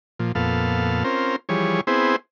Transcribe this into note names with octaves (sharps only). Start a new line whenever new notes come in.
A#2 F3
F2 A#2 B3 A4 F5
C4 C#4 F4 A#4 C5
E3 F3 G3 G#4 C#5
B3 C4 E4 G#4 C5